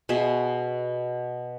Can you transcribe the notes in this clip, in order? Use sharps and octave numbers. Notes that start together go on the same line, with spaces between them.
B2 G#4 E5 C6